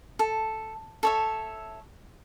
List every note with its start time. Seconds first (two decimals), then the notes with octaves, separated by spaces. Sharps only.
0.19 A4
1.03 A4 C#5 E5